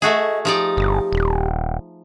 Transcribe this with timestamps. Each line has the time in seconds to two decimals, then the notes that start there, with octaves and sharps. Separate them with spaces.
0.02 A3 F#4 G#4 D#5
0.45 F3 D#4 G4 D5
0.77 G1
1.12 D#1